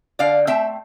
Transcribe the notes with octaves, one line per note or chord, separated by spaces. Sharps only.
D3 D5 F5
A3 C4 E5 G5